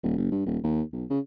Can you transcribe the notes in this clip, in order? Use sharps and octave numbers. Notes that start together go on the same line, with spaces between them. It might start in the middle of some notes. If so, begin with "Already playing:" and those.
D#1
F#1
G2
D#1
D#2
B1
C#3